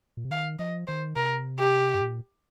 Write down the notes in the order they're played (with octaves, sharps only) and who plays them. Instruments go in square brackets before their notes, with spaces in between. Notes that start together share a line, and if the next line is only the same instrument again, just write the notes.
[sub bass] A#2
C3
[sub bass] D#3 [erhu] F5
[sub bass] F3 [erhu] D#5
[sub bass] D#3 [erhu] C5
[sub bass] C3 [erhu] A#4
[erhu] G4
[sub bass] G2
A#2